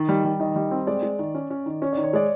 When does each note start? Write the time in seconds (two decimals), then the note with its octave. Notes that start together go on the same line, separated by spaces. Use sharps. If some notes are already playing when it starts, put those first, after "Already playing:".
Already playing: D#3 D#5
0.09 G3
0.25 G3
0.40 D#3 D#5
0.56 G3
0.71 C4
0.87 G#3 D5
1.03 G#3
1.19 D#3
1.34 C#4
1.50 C#4
1.66 D#3
1.82 C#4 C#5
1.93 D#3 D5
2.04 C#5
2.13 G#3 D5